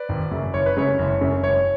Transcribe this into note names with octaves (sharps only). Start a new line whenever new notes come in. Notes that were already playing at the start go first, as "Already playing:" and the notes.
Already playing: B4 D5
G#1
F#2 C#3
F#1 C#5
B4
F#2 C#3 G#3 C#5
F#1
F#2 C#3 G#3
F#1 C#5